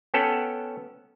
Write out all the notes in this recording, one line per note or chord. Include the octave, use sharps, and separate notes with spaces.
B3 C#4 A4 F#5 G5